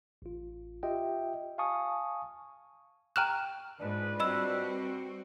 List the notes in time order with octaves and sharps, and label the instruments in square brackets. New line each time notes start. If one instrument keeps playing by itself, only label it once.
[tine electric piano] A1 F4
F4 G4 D#5 E5 G5
F5 G#5 A5 C#6 D#6
[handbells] G5 F6 F#6 [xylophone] A#5 C#6 E7
[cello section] G#2 [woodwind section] D4 F4 B4
[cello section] G3 C4 F#4 [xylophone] D#5 B5 E6